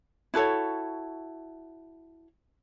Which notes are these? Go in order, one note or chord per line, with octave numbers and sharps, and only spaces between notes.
E4 F#4 A4 C#5